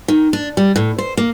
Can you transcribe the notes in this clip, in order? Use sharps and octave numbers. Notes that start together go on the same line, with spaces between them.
D#3
D4
G3
A2
C5
A#3